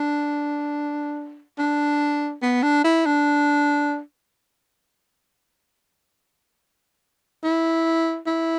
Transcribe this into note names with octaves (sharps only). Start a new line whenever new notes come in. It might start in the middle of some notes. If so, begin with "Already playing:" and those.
Already playing: D4
D4
B3
D4
E4
D4
E4
E4